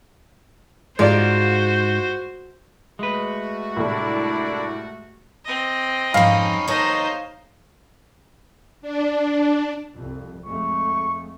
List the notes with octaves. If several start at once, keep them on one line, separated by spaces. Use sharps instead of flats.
G#2 G#3 F4 F#4 C5 D5
G#3 A3 F#4 B4
C2 A2 D4 E4 D5
C4 D#5
F2 G#2 C#4 D#4 F5 B5
D#2 D#4 A4 C5 C#5 D#5 A#5
D4
C2 F2
F2 G#3 A3 C#6